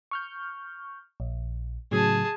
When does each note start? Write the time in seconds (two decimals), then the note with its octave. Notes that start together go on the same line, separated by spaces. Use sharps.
0.11 C#6 F6 G6
1.20 A#1
1.91 A2 C#3 F#3 G#4 A5